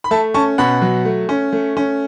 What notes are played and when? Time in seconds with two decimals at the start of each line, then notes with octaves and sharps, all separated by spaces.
0.04 B5
0.11 A3 E5 A5
0.34 C#4 A5 C#6
0.58 B2 F#5 B5
0.82 F#3
1.05 A3
1.29 C#4
1.53 A3
1.77 C#4